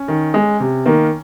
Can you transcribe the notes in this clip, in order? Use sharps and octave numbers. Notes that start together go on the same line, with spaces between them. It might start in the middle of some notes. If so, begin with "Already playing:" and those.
Already playing: C#4
D#3
G#3
C3
D#3 A#3